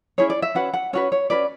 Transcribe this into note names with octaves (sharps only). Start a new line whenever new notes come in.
C#4 E4 G#4 C#5
D5
E5
C#4 F#4 B4 F#5
F#5
C#4 F#4 B4 C#5
C#5
C#4 F#4 B4 D5